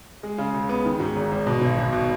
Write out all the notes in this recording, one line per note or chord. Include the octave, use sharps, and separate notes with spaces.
G#3
C#3
C#2
B3
D#3
G#2
G#1
G#1
B2
B1
B1
B2